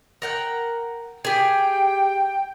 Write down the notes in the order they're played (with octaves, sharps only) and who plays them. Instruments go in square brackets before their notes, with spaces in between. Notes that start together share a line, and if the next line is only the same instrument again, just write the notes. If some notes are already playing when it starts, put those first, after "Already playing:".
[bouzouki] A#4 F#5 G5
[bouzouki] G4 G#4 [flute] G5